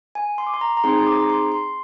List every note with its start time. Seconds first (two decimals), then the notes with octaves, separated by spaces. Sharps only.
0.15 G#5
0.38 C6
0.47 D6
0.54 C6
0.61 A#5
0.77 A#5
0.84 C4 D#4 G#4 C6
0.98 C6
1.07 D6
1.20 A#5
1.30 C6
1.52 C6